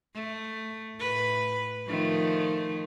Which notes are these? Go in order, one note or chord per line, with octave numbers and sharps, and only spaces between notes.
A3
A2 B4
D#3 F3 A3